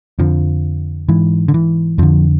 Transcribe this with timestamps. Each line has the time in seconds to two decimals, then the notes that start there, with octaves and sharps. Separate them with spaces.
0.19 F2 D3 F3
1.09 G#2 E3
1.48 D3
1.54 E3
1.98 F2 D3 F3